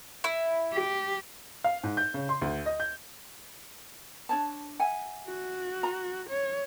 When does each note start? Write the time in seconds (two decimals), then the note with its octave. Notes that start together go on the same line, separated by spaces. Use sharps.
0.24 E4
0.74 G4
1.64 F5
1.84 G#2
1.97 G6
2.14 C#3
2.29 C6
2.42 D2
2.66 D#5
2.80 G6
4.29 D4 C#5 A5
4.80 E5 F#5 G#5
5.27 F#4
5.83 A#5
6.30 C#5